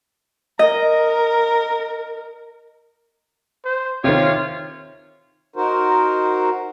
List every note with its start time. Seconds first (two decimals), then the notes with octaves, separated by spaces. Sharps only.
0.59 A#4 D#5
3.65 C5
4.04 C3 D#3 F4 C5 C#5
5.56 D#4 F#4 A#4 C5